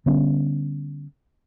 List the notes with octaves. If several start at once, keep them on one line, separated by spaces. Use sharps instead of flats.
D3 G3 B3 C#4